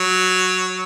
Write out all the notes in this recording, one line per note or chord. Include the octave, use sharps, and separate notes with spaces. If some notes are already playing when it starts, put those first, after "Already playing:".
Already playing: F#3